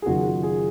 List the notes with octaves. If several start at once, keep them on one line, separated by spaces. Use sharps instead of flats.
G#4
F#1 F#2 D#3 A#3 F4 F#4
G#4